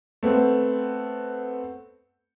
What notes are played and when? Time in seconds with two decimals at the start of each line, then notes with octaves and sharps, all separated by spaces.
0.23 A3 B3 C4